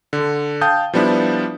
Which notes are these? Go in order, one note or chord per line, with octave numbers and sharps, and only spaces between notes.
D3
F5 G5 A5 D#6 G6
F3 G3 B3 D4 E4